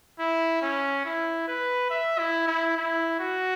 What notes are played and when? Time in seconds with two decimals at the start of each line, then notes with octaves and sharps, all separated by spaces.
0.19 E4
0.62 C#4
1.05 E4
1.48 B4
1.90 E5
2.19 E4
2.48 E4
2.77 E4
3.19 F#4